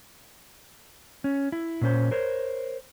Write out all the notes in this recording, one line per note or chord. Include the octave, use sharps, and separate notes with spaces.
C#4
E4
A#2 C#4 C5
A#4 C5 C#5